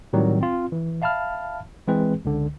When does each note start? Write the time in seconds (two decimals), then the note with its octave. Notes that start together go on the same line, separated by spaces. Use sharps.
0.13 A2 D#3 F#3 G3 C4
0.41 C4 F4
0.72 E3
1.02 E5 F5 A5 B5 F6
1.87 E3 G#3 C4 G#4 B4
2.25 C#2 D3